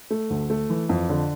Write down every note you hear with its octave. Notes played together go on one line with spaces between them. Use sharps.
A3
D2
A3
E3
F2
D3